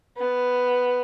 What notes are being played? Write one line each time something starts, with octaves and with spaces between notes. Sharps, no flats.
B3